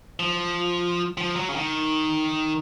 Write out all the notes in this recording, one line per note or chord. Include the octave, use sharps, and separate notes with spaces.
F3
F3
F#3
C#3
D#3